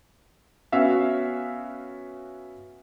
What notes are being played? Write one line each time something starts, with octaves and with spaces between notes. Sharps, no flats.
B3 C#4 F#4 E5 F5